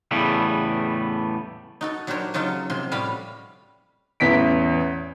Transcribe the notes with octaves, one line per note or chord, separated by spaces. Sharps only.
E2 A2 C#3 G3 A3 B3
D#4 F#4 A4
F#3 D4 G4 A#4 C5 C#5
C#3 F#3 D#4 F4 A4
C3 F3 C6
A2 G3 C#4 F#4 F5 B5
A1 E2 B6 D7